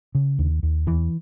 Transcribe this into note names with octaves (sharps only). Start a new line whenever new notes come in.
C#3
D#2
D#2
E2 E3